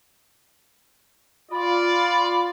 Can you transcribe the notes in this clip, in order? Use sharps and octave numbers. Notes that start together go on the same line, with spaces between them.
F4 D5 B5